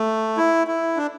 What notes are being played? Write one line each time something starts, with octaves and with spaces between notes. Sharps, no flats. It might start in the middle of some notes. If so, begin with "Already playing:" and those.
Already playing: A3
E4
E4
D4